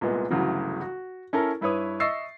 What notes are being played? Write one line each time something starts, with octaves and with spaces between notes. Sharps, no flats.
C2 A#2 G#3 B3
G1 D2 C#3 E3 F#3
F#4
C#4 E4 A4 A#4
G2 E4 B4 C#5 D#6
D#5 E5 C#6 E6 A6 C7